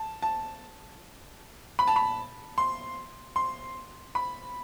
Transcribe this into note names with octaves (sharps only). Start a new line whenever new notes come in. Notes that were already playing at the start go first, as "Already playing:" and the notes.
Already playing: A5
A5
B5
A5
B5
C6
C6
B5